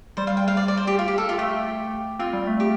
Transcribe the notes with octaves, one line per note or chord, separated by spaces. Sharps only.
G3 C5
F5
G5
F5
D5
D5
C5
G4
F4
G4
A4
F4
A3 G4
C4 F4
G3
A3
G4